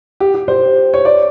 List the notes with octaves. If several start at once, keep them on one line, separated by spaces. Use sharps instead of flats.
G4
G4
C5
C#5
D5